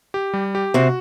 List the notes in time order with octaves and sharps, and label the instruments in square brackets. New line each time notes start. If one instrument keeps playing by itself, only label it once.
[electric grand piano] G4
G3
G4
[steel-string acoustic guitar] C3 C4 [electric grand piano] F#4